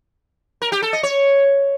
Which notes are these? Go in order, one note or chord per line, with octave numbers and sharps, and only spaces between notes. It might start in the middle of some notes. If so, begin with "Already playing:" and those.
A#4
G4
A4
D#5
C#5